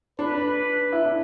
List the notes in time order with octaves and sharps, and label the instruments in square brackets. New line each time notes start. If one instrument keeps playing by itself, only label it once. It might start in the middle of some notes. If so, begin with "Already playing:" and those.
[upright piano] D4 [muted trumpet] B4
[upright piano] E4
D4